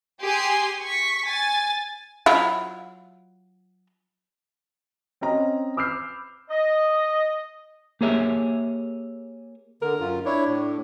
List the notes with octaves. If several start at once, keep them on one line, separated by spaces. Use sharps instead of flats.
G4 G#4 G#5 C6
C#6 B6
G#5 A6
F#3 E4 F4
C4 C#4 D#5 A#5
B5 D6 E6 F6 G6 C7
D#5
A#3 G4 G#4 A#4 C#5 E5
D3 A#4
F#2 F4
D4 E4 C#5
A2